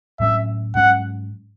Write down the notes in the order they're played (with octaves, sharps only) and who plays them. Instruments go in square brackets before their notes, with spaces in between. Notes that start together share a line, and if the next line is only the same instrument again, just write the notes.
[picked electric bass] A2 F#3 C#4 [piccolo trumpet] E5
[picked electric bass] G#2 F#3 C#4 [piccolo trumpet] F#5